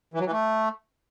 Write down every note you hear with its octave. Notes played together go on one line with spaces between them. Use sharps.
E3
F#3
E3
A3